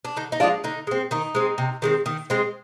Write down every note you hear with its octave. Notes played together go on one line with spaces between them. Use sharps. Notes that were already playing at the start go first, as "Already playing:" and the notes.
D4
D3 D#4
D#4
F3 G#3 D4 F4
D3 D#4
G#3 C4
D#3 D#4
G#3 C4
C3
D#3 G#3 C4
D#3
G#3 C4